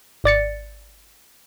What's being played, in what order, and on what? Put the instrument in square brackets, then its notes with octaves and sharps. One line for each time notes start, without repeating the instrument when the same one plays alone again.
[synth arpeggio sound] G#1 D5 A6 C#7